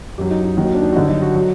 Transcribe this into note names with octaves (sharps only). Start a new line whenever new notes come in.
F#2 F#3 G4
D#4
D#4
D#2 D#3 F#3 F#4
D#4
D4
D#4
F#4
G2 D3 F#3 D#4
D#4
F#4
F#3